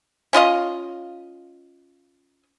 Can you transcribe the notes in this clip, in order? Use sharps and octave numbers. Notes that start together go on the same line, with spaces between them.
C#4 F4 D#5 F5